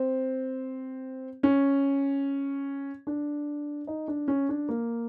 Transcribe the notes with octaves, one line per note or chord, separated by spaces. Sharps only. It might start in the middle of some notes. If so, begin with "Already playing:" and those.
Already playing: C4
C#4
D4
D#4
D4
C#4
D4
A#3